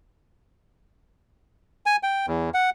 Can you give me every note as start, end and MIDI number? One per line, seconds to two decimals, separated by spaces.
1.86 1.96 80
2.03 2.26 79
2.28 2.50 40
2.54 2.70 78